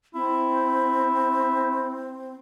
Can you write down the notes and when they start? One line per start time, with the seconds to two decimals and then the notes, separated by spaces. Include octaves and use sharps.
0.15 C4 E4